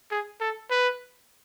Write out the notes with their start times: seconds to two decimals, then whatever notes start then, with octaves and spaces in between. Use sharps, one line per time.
0.11 G#4
0.41 A4
0.71 B4